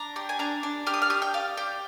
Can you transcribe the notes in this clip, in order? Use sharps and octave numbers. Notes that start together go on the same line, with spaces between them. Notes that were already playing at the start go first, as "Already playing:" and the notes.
Already playing: D4 A#5
G4
G#5
D4 A#5
D4
G4 F6
D#6
F6
G4 D#6
G5
D4 F5
G4 G5